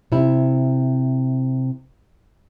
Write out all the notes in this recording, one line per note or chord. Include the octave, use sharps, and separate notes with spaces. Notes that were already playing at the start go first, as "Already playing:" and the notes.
C3 E4